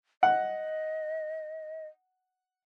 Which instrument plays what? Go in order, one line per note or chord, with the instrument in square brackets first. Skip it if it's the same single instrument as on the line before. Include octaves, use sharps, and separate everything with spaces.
[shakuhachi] D#5 [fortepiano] F#5